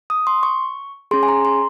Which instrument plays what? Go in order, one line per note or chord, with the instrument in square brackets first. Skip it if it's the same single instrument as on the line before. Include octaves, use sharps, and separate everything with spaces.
[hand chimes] D#6
C6
C#6
C#4 G#4 C6
G#5
A#5
C6